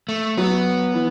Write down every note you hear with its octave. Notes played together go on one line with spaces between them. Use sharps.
A3
F#3 B3
E3